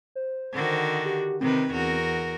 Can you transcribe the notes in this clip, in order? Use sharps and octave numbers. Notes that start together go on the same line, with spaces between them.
C5
D3 D#3 F#4
G4
C3 D#3 C4 B4
E2 F#4 A#4